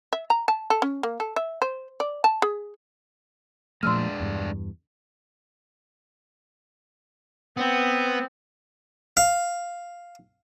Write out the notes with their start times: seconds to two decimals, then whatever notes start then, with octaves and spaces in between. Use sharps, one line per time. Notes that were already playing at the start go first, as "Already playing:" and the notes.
0.13 E5
0.30 A#5
0.48 A5
0.70 A4
0.82 C#4
1.03 A#3
1.20 A4
1.36 E5
1.62 C5
2.00 D5
2.24 A5
2.42 G#4
3.83 A#2 F3 G#3 A3 D4 C6 E6 F6
4.20 E2 G2
7.57 B3 C4
9.17 F5